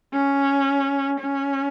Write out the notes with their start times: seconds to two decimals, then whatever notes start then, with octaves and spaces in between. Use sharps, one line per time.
0.13 C#4
1.20 C#4